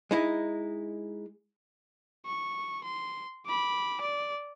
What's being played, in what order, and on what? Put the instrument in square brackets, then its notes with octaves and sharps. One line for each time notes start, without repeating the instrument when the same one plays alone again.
[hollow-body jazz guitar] G#3 D#4 E4
[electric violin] C#6
C6
B5 D6
D5